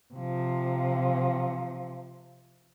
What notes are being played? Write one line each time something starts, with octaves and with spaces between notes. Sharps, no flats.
C3 F3